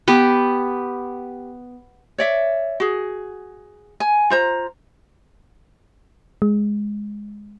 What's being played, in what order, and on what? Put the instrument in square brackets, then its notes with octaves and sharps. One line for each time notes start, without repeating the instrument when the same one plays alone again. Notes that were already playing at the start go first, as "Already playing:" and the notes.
[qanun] B3 G4
[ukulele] C#5 D5 E5
F#4 G#4
G#5
F4 C5 A#5
[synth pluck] G#3